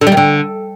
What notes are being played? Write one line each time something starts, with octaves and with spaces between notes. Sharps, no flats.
D3
G3
D#3
D3